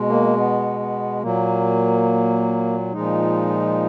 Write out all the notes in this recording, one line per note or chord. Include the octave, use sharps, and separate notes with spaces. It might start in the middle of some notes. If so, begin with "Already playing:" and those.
Already playing: B2 G#3
A#3
B3
B3
A#2 F#3 A#3
A#2 F3 G#3 D#4